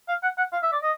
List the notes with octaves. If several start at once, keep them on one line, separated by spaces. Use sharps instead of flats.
F5
F#5
F#5
F5
E5
D5
D#5